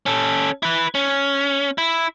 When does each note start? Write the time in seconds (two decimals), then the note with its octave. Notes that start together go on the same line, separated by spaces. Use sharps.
0.06 C#4 A4
0.63 E4 B4
0.95 C#4
1.78 E4